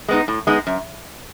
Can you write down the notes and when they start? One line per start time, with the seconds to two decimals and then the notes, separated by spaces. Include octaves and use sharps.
0.08 G#3 B3 D#4
0.28 A2
0.47 G#3 B3 D#4
0.67 F#2